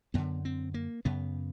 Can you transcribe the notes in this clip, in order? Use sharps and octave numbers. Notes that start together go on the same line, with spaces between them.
F#2 D3 B3
C4
A#3
F#2 C#3 B3